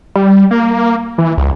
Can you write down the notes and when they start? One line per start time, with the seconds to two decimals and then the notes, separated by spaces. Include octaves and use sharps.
0.16 G3
0.51 A#3
1.18 E3
1.38 C#2